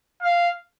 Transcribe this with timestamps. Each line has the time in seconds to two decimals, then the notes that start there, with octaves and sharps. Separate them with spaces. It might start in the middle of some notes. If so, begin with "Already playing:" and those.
0.22 F5